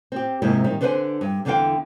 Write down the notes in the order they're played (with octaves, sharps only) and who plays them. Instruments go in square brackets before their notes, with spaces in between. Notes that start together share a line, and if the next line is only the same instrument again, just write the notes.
[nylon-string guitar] C4 G4
F2 G#2 C3 A#3 E4
D#3 G3
D3 D4 B4 C5 F5 G#5
G2
E2 D3 E3 D4 F5 G5